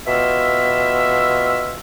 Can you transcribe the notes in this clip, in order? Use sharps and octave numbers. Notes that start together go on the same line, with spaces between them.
B2 F4 E5